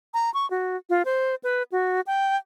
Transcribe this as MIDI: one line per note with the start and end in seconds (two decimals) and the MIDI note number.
0.14 0.33 82
0.34 0.48 85
0.51 0.77 66
0.90 1.03 65
1.05 1.35 72
1.44 1.63 71
1.72 2.01 66
2.07 2.36 79